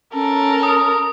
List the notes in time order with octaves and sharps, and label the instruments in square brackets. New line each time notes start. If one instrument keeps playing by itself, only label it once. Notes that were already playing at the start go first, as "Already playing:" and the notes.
[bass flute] C#4 [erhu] A4 [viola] A#4
[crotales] D#6